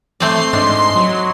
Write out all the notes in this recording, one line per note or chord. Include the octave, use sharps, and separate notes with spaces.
A3 C4 D5 C6
G#2 D4 D#5
F#3